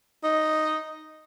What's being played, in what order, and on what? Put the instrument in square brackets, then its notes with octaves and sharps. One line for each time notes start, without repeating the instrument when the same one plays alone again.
[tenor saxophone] D#4